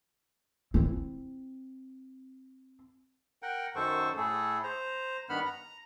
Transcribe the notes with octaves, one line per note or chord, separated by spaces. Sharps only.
C4 E4
A#4 F#5 G5
F#2 D#3 A4 C5 C#6
A2 A3 G#4 A4
C5 A#5
G2 D#3 B3 F#5 B5 F6
A#5